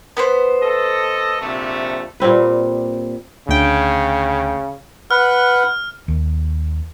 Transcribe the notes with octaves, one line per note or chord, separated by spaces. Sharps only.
B3 B4 C5
A4 D#5
A#1 C3 A3
A#2 G3 C4 B4
D2 C#3 G5
B4 F#5 F6
D#2